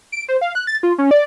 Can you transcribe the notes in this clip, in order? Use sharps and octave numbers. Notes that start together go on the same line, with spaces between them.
D7
C5
F5
F#6
A6
F4
C#4
D5